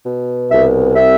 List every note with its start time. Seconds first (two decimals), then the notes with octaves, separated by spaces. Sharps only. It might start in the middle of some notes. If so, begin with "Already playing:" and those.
0.06 B2
0.51 C2 E5
0.96 C3 E5